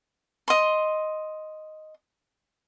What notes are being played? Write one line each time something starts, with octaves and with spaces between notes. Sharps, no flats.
D#5 C6